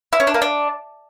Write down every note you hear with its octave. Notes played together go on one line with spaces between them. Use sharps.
E4
C#4
D4
A#3
D4